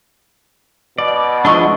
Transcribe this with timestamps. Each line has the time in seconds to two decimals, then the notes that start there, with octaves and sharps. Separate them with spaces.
0.98 B2 D5
1.45 F3 G#3 D4 E4 D#5 C#6